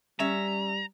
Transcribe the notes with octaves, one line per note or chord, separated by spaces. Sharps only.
G3 C#4 E5 A#5